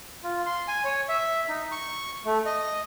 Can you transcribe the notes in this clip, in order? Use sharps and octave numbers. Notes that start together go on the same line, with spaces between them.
F4
C6
G#5
C#5
E5
D#4
C#6
A3
D#5